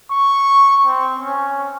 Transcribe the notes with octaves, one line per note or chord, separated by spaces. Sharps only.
C#6
C4
C#4